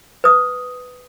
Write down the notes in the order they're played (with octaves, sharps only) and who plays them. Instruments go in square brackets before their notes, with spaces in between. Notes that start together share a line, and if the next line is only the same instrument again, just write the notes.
[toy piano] B4 D#6